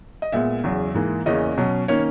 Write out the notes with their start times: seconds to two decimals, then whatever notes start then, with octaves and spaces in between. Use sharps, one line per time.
0.22 D#5
0.32 A#2 G#3 B3 E5
0.64 E2 C#3 F#3
0.94 G#2 E3 A#3
1.26 E2 C#3 E3 A#3 C#4 D#5
1.58 B2 F#3 C#4
1.88 D#3 A#3 C#4 C#5